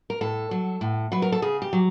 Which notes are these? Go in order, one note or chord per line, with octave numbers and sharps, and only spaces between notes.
A#4
A2 A4
F#3
A2
F#3 B4
A#4
A4
C#3 G#4
G4
F#3